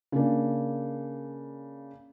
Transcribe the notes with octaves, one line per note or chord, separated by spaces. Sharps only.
C#3 A#3 D4